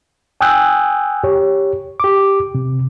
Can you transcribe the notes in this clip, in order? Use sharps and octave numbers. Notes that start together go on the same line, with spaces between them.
G5 G#5 D#6 E6 F#6 G6
G4 C#5
G4 D6
C3